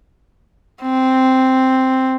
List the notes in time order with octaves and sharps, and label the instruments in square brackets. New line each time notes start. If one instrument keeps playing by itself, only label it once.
[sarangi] C4